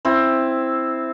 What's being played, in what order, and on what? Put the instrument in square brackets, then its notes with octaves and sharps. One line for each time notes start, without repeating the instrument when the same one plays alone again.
[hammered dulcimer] C4 E4